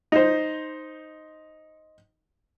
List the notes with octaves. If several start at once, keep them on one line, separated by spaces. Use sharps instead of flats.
D#4 C5